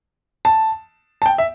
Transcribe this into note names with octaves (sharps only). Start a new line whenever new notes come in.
A5
A5
G5
E5